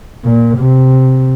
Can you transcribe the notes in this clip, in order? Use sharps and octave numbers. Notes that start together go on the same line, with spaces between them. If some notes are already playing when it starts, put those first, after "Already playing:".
A#2
C3